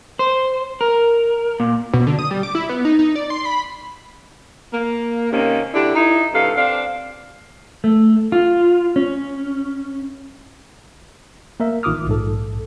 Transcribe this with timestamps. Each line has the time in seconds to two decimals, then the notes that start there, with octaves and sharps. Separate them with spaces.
0.19 C5
0.81 A#4
1.60 A#2
1.94 B2
2.07 D3
2.19 D#6
2.31 G3
2.43 D6
2.55 E4
2.69 B3
2.85 D#4
2.99 D#4
3.15 D5
3.30 C6
3.45 B5
4.73 A#3
5.32 C3 D#3 A#3 C#4
5.73 D3 D4 E4 G4
5.95 D#4 E4
6.34 G2 C3 A4 F5
6.56 C4 D4 F5
7.84 A3
8.32 F4
8.96 C#4
11.60 A#3 A#4 E5
11.83 A1 D#3 F4 D6 D#6 F6
12.07 A#1 G#2 A4